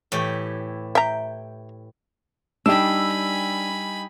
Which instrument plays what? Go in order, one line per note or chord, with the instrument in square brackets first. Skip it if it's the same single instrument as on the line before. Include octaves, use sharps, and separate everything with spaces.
[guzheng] A2 E3 G4
[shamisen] E5 A#5 [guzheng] G5
[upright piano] G3 D#4 G5 [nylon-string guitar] D4 [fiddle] G#5 B5 [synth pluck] E6